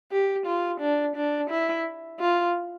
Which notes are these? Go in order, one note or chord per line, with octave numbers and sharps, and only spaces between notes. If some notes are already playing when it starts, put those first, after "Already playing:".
G4
F4
D4
D4
E4
F4